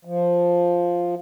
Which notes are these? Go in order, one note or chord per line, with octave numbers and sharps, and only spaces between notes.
F3